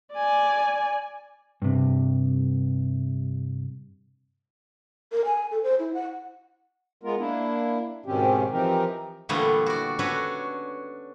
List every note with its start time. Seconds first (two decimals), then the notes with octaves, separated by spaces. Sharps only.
0.14 D5 G#5
1.62 G2 C3
5.12 A#4
5.25 G#5
5.51 A4
5.63 C5
5.79 E4
5.94 F#5
7.03 G#3 B3 F4 A#4
7.18 A#3 D4 E4
8.06 G#2 B2 D#3 C4 C#4 G4
8.51 E3 F3 C4 D#4 G4 A#4
9.29 A#2 D3 E3 G3 A3 B3
9.66 F#4 D5
9.99 C#4 D4 F#4 A4 B4 C#5